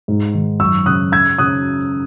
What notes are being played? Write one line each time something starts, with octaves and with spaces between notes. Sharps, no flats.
G#2
D#3
F#2 C#6 E6
C#3 D#6 F#6
C#4 E6 G#6
C#3 D#6 F#6